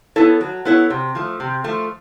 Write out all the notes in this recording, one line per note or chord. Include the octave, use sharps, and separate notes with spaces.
B3 E4 A4 C#5
F#3
B3 E4 A4 C#5
C3
F3 A3
C3
F3 A3